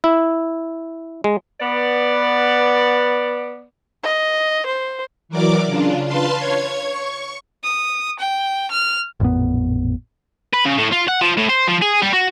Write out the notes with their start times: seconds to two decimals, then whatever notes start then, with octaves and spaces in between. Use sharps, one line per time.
0.04 E4
1.24 G#3
1.60 B3 D5
4.04 D#5
4.67 C5
5.29 E3 F#3 A#4 D5 D6
5.67 C#3 D4 F4
6.06 B4 F5 A5 C6
6.37 C#5 G#6
6.81 C#6
7.64 D#6
8.20 G5
8.71 F6
9.20 A1 F2 A#2 B3
10.54 B4
10.65 C#3
10.78 A2
10.92 F4
11.08 F#5
11.21 F3
11.37 A2
11.49 C5
11.67 F3
11.82 G#4
12.02 G3
12.13 F#4